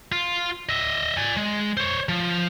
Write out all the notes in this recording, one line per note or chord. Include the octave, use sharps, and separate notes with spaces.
F4
D#5 E5
D5 G#5
G#3
C5 C#5
F3